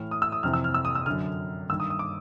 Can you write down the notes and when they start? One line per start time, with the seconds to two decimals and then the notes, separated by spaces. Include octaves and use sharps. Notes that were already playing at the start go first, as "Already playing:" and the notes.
Already playing: A2 E3 F6
0.11 D#6
0.22 E6
0.32 D#6
0.43 F2 C3 E3 F6
0.54 E6
0.64 F6
0.74 E6
0.85 D#6
0.95 E6
1.06 F#2 D3 F6
1.70 G2 D#3 E6
1.80 D#6
1.90 D#6
1.99 D6